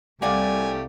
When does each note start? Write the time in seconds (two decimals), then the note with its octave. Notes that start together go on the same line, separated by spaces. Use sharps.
0.22 C2 A3 A#3 G4 D5 F#5 G#5